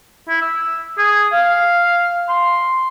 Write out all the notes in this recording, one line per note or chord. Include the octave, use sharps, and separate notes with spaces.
E4
E6
G#4
F5
C6